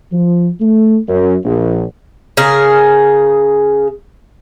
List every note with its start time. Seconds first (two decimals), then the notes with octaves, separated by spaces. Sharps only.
0.12 F3
0.60 A3
1.09 F#2
1.44 A#1
2.37 C#3 G#4 A#4